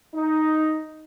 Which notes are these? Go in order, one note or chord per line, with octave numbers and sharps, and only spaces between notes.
D#4